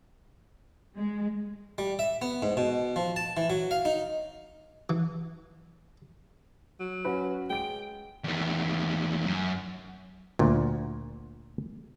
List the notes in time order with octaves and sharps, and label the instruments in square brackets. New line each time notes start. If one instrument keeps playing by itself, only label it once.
[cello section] G#3
[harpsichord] G3
E5
B3
G#2
B2
F3
A5
E3
F#3
F5
D#4
E3
[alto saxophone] F#3
[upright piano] C#4 F#4 B4
[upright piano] G#3 D7 [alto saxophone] G5
[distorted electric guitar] E2 D#3
F#2
[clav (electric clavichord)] D2 A#2